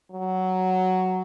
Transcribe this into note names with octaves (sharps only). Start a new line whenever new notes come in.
F#3